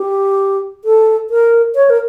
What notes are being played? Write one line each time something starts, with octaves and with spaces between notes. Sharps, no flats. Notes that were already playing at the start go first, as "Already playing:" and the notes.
Already playing: G4
A4
A#4
C#5
A#4